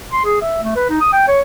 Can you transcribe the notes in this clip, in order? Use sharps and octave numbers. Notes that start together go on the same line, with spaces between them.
C6
G#4
E5
A3
B4
D#4
D#6
G5
C#5